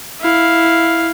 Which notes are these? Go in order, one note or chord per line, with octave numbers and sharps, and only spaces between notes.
E4 F5